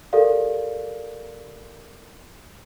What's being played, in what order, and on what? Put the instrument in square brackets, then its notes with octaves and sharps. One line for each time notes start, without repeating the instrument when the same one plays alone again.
[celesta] G4 A4 A#4 D5 F5